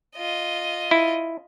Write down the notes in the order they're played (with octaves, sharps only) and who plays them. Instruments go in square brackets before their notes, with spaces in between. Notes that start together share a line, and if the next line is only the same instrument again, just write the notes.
[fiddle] F4 D#5
[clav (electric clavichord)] E4